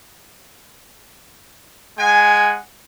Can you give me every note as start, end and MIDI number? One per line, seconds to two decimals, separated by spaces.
1.98 2.58 56
1.98 2.58 78
1.98 2.58 80